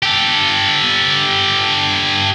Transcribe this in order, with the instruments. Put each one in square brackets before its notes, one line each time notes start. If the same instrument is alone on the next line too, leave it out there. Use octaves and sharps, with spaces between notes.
[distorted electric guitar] G4 A4